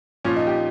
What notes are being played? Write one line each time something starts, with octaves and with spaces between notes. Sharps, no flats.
A#2 F3 C#4
D#4
G4